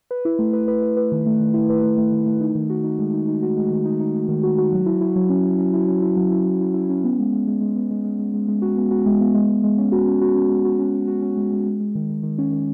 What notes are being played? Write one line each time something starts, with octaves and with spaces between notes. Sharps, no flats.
B4
E4
A3
B4
B4
B4
B4
D#3
A3
D#3
E4
B4
A3
A3
D#3
A3
D#4
D#3
F#4
D#4
G#3
D#4
D#4
F#4
G#3
D#3
D#4
D#4
D#4
D#3
F#4
F#4
F#3
E4
E4
F#3
C#4
C#4
C#4
E4
C#4
E4
F#3
E4
F#3
E4
E4
C#4
B3
G#3
G#3
G#3
G#3
B3
G#3
G#3
G#3
G#3
G#3
F#4
B3
F#4
G#3
B3
G#3
G#3
G#3
C#4
F#4
C#4
F#4
C#4
G#3
F#4
C#4
C#4
F#4
C#4
G#3
G#3
G#3
G#3
D#3
D#3
D#3
C#4
D#3